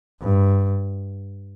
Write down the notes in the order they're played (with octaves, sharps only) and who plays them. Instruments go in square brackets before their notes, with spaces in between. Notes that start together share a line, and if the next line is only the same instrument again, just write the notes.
[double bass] G2